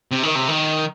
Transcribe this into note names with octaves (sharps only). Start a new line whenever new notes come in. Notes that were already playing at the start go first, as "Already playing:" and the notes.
C3
D#3
C3
D#3